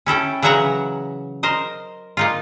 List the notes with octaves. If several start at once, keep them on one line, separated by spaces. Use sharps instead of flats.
C#4 E4 A4 G5
C#3 E3 F#3 E5 F#5 A#5
A#4 C5 D#5
A#3 D#4 F4